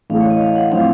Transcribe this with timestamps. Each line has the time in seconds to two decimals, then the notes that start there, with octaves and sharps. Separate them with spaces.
0.10 A1 A2 A3 F5
0.21 C#5
0.30 D#5
0.41 F5
0.56 F#5
0.71 A2 F3 C4 F5